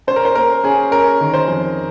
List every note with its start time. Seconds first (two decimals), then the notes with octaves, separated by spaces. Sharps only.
0.07 C#4 C5
0.16 A#4
0.25 C5
0.35 A#3 A#4
0.64 C#4 G#4
0.91 C#4 A#4
1.21 D#3
1.34 C5
1.48 F2